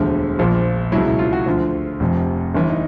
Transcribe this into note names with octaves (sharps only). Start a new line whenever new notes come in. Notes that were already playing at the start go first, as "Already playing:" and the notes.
Already playing: E1 D2 D3 F3
A#1 A#2 F3
C#2 B2 F#3 E4
E4
F4
F#4
D2 D3 F3 F4
F1 F2 C3
G1 G2 E3
D#4